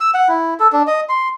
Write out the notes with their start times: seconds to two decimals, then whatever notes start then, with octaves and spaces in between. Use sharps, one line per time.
0.01 E6
0.14 F#5
0.29 E4
0.60 A4
0.72 D4
0.87 D#5
1.09 C6